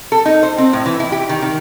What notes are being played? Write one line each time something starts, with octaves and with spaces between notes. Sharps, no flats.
A4
D#4
C5
C4
A2
E3
E4
G4
D#3
D#3